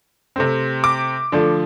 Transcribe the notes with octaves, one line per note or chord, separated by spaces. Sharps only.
C3 A3 C4
D6
D3 F3 A3